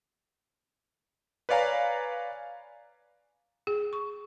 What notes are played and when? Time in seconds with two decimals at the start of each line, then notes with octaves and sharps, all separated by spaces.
1.49 B4 C#5 D5 F5 G#5 A#5
3.67 G#4
3.93 C#6